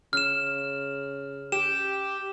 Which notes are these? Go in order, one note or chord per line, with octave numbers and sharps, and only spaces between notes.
C#3 F6 E7
G4 E7